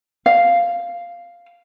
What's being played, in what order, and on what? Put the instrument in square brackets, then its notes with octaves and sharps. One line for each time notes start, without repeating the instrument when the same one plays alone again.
[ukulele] F5